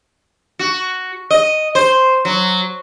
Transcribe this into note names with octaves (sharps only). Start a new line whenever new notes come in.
F#4
D#5
C5
F#3